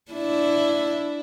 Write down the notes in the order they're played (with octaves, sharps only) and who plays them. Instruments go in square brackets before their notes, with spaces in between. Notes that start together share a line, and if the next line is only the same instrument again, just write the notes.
[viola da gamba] D4 E4